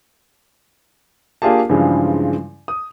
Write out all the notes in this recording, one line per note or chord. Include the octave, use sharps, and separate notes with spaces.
A#3 D4 F4 G4 G#4 A5
G2 C#3 E3 F3 G3 G#3
D#6